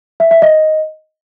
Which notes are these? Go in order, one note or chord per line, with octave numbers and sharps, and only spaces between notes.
E5
E5
D#5